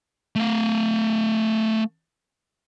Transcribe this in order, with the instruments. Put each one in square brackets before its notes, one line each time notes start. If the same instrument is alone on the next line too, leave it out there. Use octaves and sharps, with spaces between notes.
[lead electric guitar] A3 F5